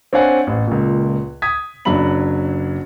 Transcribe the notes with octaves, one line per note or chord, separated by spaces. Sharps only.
C4 D4 C#5 F5 F#5 G#5
A1
C#2 A#2
D#6 G#6 B6
F#1 F#3 D4 E5 B5 F#7